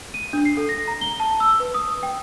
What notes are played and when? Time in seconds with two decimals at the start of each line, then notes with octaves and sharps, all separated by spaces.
0.14 D#7
0.33 D4
0.45 C7
0.57 A4
0.69 A#6
0.88 A#5
1.01 G7
1.20 A5
1.40 E6
1.60 B4
1.74 D#6
2.03 G5